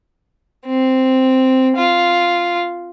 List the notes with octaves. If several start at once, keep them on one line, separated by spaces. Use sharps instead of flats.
C4
F4